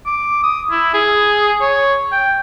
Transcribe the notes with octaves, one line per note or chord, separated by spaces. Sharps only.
D6
D#6
E4
G#4
C#5
G5